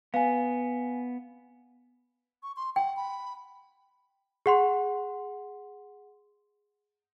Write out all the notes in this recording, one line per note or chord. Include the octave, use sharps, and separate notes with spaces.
B3 F5 G#5
C#6
C6
F#5 G5
B5
G#4 F#5 C6